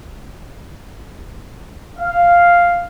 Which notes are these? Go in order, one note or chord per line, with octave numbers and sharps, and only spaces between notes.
F5